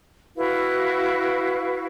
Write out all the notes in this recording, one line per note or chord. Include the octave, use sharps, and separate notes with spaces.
E4 F#4 B4 F5